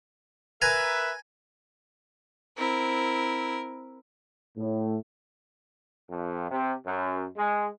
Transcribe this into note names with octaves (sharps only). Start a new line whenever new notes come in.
A#4 B4 E5 G#5 A#5
C4 E4 A#4
A2
F2
C3
F#2
G#3